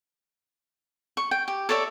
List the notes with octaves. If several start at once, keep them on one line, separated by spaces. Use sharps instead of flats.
C#6
G5
G4
A4 C#5 D5 E5